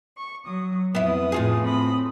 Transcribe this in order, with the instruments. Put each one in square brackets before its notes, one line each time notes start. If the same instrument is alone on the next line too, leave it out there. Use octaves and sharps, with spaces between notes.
[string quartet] C#6
F#3 D#6
[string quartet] F2 B4 D#6 [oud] B3 E4
[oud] A2 F4 G#4
[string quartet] C4 B5 D#6